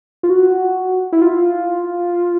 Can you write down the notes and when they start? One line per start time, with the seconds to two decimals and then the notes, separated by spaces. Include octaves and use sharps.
0.23 F4
0.30 F#4
1.12 E4
1.22 F4